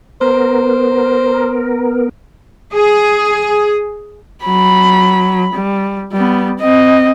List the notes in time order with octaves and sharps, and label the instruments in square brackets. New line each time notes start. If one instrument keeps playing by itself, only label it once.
[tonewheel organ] B3 A#4 [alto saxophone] C5
[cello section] G#4
[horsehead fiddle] F#3 B5
G3
G3 B3
C4 D#5